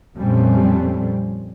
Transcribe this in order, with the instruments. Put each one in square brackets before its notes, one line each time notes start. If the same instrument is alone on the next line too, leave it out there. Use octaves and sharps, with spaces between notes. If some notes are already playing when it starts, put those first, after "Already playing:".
[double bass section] F2 A#2 G3 A3 C4 C#4